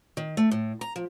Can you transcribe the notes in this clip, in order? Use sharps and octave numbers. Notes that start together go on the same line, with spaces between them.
D#3
A3
A2
A#5
F3